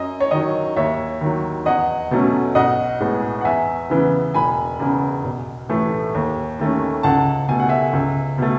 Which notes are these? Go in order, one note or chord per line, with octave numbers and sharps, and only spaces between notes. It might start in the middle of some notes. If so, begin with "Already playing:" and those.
Already playing: F#2 D#5
C#5
D#3 F#3 D#5
D#2 C#5 E5
D#3 F#3
E2 D#5 F#5
B2 F#3 A3 C#4
B1 D#5 F#5
A2 G#3 B3
F#5
E2 E5 G#5
C#3 E3 B3
E1 G#5 B5
E2 C#3
B1
A2 E3 A3
D#2
D#3 A3 C#4
C#2 F#5 A5
B2 A3 G#5
F#5
E5 G#5
C#2
B2 A3